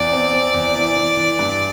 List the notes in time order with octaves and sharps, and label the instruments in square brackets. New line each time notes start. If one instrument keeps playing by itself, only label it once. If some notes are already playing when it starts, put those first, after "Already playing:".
Already playing: [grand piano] E2 E3 [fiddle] D5
[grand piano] C4
C4
E2
E3
E3
E3
G2